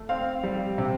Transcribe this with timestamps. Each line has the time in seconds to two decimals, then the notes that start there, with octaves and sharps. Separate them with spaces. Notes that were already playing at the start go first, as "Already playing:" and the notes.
Already playing: A3
0.09 C4 F5
0.43 G3
0.78 C3